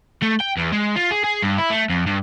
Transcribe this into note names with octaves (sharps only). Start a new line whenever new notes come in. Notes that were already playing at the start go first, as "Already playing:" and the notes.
A3
G5
E2
G#3
F4
G#4
G#4
G2
E4
A3
F2
G2